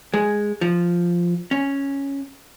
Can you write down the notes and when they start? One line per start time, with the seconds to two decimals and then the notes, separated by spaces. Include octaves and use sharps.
0.14 G#3
0.61 F3
1.51 C#4